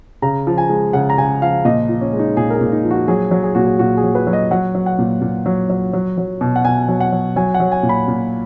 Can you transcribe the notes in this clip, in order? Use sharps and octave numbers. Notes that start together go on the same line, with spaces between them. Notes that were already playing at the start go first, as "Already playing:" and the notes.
C#3 A#5
F3
G#5
G#3
C#3 F#5
A#5
C#3 G#5
F3 F5
A#2 D#5
F3
C#4
G#3
D#4
A#2 G#4
A#4
G#4
A#2
D#4
F3
F#4
F#3 G#4
F#3
G#4
A#2 F#4
G#4
A#2 F#4
G#4
F#3
B4
F#3
D#5
F#3 F#5
F#3
F#5
A#2
A#2
F#3
F#3
F#3
F#3
B2
F#5
B2 G#5
F#3
F#5
F#3
F#3 G#5
F#5
F#3
G#5
A#2
B5
A#2